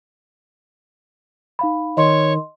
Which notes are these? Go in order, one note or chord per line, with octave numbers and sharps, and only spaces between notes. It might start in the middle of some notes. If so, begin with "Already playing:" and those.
D#4 F5 B5
D#3 C#5 D#5 C6